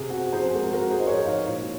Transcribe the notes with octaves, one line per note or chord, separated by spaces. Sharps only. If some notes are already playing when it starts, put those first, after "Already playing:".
Already playing: C3 G#4
C4 F#4
F3 G#4 C5
G#3 F#4 A#4
F#4 A#4
G#3
G#4 C5
F3 D#5
A#4 C#5
D#4 C#5 F5
A#2